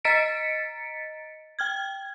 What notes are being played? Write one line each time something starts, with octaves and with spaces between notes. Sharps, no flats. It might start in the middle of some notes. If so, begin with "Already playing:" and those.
D#5 A#5 A6 B6 C#7 D7
G5 F6 G#6